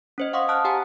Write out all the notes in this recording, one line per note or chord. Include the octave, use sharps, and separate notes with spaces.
C#4 C5 D#5
F5 F#5 C6 C#6 D#6
A5 D#6 F6 F#6
G4 F#5 G#5 A#5